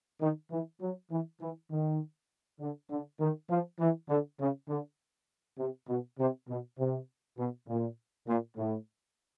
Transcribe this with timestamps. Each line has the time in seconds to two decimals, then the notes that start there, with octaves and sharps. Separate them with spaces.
0.21 D#3
0.51 E3
0.81 F#3
1.11 E3
1.41 E3
1.71 D#3
2.60 D3
2.90 D3
3.20 D#3
3.50 F3
3.80 E3
4.10 D3
4.40 C#3
4.69 D3
5.59 C3
5.88 B2
6.19 C3
6.49 B2
6.79 C3
7.38 B2
7.68 A#2
8.28 A#2
8.58 A2